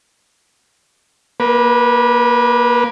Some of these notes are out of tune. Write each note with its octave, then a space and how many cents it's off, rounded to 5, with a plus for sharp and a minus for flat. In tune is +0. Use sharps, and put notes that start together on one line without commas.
A#3 +15 B4 -20